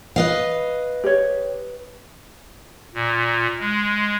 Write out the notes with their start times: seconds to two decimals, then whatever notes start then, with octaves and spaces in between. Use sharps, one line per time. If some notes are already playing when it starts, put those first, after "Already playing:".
0.16 B4 D#5 F5
1.04 G4 C#5
2.95 A#2
3.60 G#3